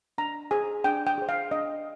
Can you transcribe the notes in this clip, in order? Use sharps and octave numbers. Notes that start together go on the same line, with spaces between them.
D4 A#5
G#4 C5 G#5
D4 G5
G5
G#4 C5
F5
D4 D#5